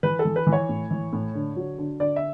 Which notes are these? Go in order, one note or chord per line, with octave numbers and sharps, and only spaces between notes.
E3 B4
A4
E3
B4
E3
C#5
A2
E3
A2
D3
F#3
D3
D3 D5
E5